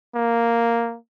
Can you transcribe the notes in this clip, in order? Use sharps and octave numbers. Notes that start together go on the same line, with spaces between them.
A#3